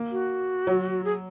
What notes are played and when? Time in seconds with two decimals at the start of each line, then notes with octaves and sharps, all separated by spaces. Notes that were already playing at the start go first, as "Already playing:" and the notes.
Already playing: A#3
0.11 F#4
0.67 F#3
1.04 G#4